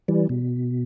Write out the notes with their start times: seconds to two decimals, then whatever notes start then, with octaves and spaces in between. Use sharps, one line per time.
0.08 E3 G3
0.29 B2